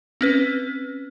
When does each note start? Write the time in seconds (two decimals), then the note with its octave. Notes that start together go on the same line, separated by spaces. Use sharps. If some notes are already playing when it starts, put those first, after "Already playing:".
0.21 C4 C#4 B4